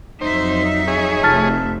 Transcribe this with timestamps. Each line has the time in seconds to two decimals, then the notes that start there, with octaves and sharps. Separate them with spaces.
0.21 F2 F#3 D#4 C5 E5
0.88 G#4 C#5
1.23 F1 F3 A3 A5 F6 A6